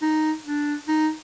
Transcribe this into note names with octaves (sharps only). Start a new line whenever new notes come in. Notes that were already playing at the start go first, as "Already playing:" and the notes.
D#4
D4
D#4